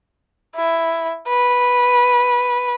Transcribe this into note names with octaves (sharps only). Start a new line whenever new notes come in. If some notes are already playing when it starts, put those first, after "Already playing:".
E4
B4